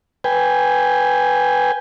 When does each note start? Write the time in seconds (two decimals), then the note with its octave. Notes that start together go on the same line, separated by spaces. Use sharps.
0.24 B4 G5 G#5